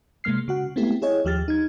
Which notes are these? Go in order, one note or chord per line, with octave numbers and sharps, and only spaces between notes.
C3 G#3 A#3 F6 C7
C#3 F#4 F#5
G#3 A3 B3 C4 E4 G4
E4 G#4 C#5 D#5
D#2 F3 G4 F6 A6
D#4 G#6